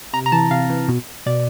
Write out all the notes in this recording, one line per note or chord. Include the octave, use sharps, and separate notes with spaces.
C3 A#5
A#5
E3 A5
C3 F5
E3
B2
B2 D5